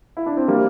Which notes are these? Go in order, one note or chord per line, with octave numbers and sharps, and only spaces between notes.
E4
D4
C4
G3 A#3